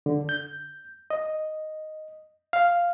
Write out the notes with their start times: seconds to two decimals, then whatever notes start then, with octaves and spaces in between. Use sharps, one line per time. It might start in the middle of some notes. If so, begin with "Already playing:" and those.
0.06 D3
0.29 G6
1.10 D#5
2.53 F5